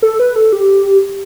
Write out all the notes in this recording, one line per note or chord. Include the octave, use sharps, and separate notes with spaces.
A4
B4
A4
G4